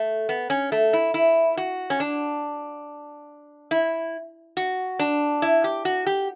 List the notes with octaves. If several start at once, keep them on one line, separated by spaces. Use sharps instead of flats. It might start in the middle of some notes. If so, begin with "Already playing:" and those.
Already playing: A3
B3
C#4
A3
E4
E4
F#4
C#4
D4
E4
F#4
D4
E4
G4
F#4
G4